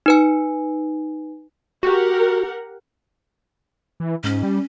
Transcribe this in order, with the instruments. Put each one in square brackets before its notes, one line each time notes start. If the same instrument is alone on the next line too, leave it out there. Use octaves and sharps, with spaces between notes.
[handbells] D#4 B4 G#5
[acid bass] F#4 [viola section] G4 A#4 F#5
[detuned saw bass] E3
[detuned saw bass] G#2 [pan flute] C#4
[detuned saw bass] G3